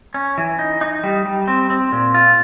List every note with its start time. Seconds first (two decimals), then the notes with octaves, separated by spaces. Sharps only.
0.14 C#4
0.38 E3
0.59 D#4
0.81 D#4
1.04 G3
1.25 G3
1.48 C4
1.70 C4
1.92 A#2
2.14 F4